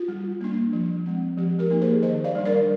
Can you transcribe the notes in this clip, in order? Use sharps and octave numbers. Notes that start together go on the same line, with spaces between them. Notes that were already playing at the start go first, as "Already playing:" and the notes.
Already playing: F4
G3
A#3 D4
F3
G#3 C4
F3 G4
G4 A#4
A#3 D#4
G#4 C5
D#3 C5 D#5
D5 F5
G3 D4
A#4 D5